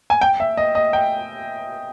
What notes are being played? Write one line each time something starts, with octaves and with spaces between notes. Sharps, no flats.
G#5
G5
E5
D#5
D#5
G5